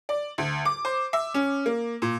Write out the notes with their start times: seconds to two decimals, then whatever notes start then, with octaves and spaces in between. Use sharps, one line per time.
0.09 D5
0.38 D2
0.65 D6
0.85 C5
1.13 E5
1.34 C#4
1.66 A#3
2.02 A#2